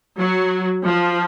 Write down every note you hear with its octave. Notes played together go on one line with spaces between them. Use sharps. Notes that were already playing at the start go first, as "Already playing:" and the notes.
F#3
F3